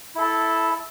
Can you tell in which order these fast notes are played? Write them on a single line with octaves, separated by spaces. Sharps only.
E4 A4 A5